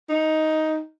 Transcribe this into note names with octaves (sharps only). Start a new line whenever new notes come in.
D#4